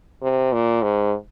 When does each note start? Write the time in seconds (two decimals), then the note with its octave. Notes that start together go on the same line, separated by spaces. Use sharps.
0.22 C3
0.53 A#2
0.82 G#2